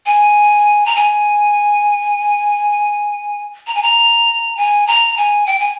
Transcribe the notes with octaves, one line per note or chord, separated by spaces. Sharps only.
G#5
A#5
G#5
A#5
G#5
A#5
G#5
A#5
G#5
G5
G#5